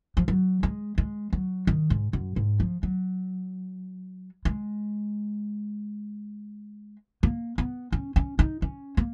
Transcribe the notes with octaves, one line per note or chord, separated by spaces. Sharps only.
F3
F#3
G#3
G#3
F#3
D#3
G#2
F#2
G#2
F3
F#3
G#3
A#3
B3
C#4
C#4
D#4
C#4
A#3